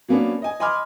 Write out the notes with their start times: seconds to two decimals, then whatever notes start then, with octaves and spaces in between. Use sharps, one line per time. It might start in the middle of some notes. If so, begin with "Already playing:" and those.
0.08 F#3 A#3 B3 C#4 D4
0.42 D#5 G#5
0.60 D#5 G#5 B5 C6 D6 F6